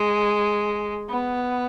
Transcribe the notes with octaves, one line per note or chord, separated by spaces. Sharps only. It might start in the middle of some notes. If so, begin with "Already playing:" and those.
Already playing: G#3
B3